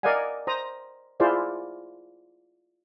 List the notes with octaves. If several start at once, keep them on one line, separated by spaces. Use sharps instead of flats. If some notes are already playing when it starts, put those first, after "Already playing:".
A#4 D5 D#5 F5 F#5 G#5
C5 A#5 D#6
E4 F4 G#4 C5 D5 F5